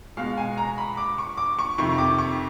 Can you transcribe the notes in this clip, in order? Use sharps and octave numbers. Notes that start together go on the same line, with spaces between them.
B2 G#3 F5
G#5
A#5
B5
D6
C#6
D6
C#6
F2 C3 D#3 C#6
D6
C#6